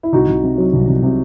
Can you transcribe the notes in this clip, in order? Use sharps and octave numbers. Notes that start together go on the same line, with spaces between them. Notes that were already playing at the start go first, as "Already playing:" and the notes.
E4
C2 D#4 F#4
C2
C3
F#3
C2
C2
C3